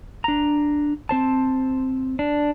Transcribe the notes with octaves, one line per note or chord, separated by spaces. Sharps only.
D4 A#5
C4 C5 A5
D4